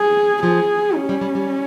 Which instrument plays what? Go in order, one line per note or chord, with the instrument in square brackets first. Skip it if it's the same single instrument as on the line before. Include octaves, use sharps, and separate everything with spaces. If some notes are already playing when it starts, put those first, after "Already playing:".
Already playing: [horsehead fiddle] G#4
[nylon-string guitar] F3 [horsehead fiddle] G#4
[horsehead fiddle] C#4
[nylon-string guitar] G3
G3
G3